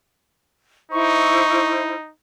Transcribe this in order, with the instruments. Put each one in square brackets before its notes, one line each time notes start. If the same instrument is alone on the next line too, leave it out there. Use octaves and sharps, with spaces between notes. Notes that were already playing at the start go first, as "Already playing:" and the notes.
[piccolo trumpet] D#4 [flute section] E4 C5 [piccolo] C#6